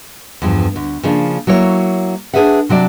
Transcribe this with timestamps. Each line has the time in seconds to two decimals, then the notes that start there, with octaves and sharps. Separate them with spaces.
0.42 E2 G2 F3
0.76 D2
1.03 C#3 F3 A#3 D4
1.47 F#3 A#3 E4 C#5
2.34 D4 G#4 B4 E5 F#5
2.69 C3 F#3 D4 D5